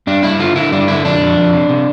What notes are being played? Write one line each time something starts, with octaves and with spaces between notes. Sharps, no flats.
G2 D4
G2 E4
D3 F4
D3 E4
G2 D4
D3 E4
F2 D4
F2
F2
C3
C3